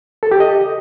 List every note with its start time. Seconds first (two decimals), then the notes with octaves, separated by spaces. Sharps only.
0.23 A4
0.31 G4
0.40 D#5